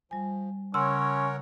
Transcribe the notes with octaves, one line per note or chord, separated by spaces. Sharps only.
F3 G3 G#5
C#3 C#4 A#4 C#5 F#5 C6 E6